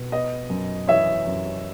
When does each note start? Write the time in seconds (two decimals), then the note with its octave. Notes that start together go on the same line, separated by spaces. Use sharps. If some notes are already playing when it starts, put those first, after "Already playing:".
Already playing: B2
0.12 B3 D#5
0.50 F#2
0.87 E3 C#5 E5
1.27 F#2